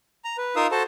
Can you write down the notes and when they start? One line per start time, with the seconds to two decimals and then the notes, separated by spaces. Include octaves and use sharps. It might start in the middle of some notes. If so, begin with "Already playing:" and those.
0.24 A#5
0.38 B4
0.56 D#4 F4 A#4 F5 D#6 E6
0.71 F#4 A4 C5 A5